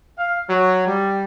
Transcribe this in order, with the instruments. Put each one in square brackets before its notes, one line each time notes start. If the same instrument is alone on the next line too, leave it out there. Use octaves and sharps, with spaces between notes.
[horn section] F5
F#3
G3